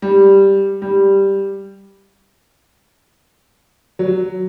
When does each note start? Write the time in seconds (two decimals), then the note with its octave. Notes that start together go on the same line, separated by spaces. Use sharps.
0.02 G3
0.82 G3
3.99 F#3